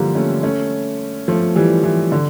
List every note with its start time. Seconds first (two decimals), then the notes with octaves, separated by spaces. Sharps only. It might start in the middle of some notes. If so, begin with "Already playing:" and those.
Already playing: D3 E3 F3 G3 A#3
0.15 A3 C#4
0.43 A3 C#4
1.28 F3 A3
1.55 E3 G3
1.84 E3
2.12 D3